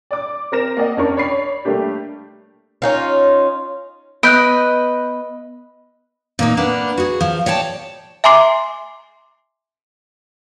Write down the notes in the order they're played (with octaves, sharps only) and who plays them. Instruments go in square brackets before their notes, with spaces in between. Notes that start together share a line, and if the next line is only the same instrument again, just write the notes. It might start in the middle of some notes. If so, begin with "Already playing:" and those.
[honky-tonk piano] D5 D6
C4 A#4 A#6 E7
A#3 D5 D#5 F#5
F2 C#4 D4 A#4 C#6
C#5 D5 B5 C7
G3 A3 A#3 D4 G4
[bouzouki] C#4 D#4 F4
[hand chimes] B3 [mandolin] B4 [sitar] D#5 [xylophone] F#6 G6 D7
[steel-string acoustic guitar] A#2 A#3 D#4
A#3 B3 D4
F#4 G#4
F3
C#5 D5 G5 A5
[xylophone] E5 G#5 A#5 C6 D6 C7